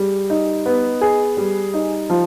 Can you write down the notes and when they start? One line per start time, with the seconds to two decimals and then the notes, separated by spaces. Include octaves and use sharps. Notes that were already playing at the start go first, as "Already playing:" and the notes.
Already playing: G3 G#4
0.30 D#4
0.66 B3
1.01 G#4
1.37 G3
1.74 D#4
2.10 F3